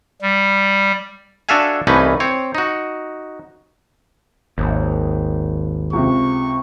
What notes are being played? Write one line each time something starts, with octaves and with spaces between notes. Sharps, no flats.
G3
D4 F#4 A4 E5 F5 G#5
C2 E3 A3 C#4 D#4 B4
C4 C#5
D#4 F#4
G#1 D#2
C#2 C3 C#6